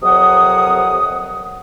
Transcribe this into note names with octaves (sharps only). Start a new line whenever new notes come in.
F2 C3 F#3 A#4 F#5 D#6